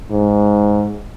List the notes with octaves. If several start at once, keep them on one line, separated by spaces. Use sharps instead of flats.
G#2